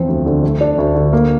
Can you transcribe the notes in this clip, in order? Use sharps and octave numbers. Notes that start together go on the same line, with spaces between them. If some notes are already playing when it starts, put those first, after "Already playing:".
Already playing: E2 F3 C4
D2
D3
A3
D4
D2
D3
A#3